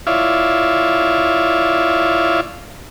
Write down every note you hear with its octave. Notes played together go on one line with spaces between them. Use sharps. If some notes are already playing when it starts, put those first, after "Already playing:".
E4 F4 C#5 D5 E5 F5